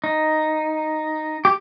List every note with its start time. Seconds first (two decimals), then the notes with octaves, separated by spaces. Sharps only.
0.04 D#4
1.45 G4